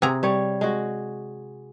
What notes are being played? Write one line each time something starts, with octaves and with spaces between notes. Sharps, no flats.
C3 G#4 A#5
G3 C#5
G#3 F#4